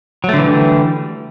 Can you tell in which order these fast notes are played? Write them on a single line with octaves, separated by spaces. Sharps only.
F#3 A3 D3 E3 G3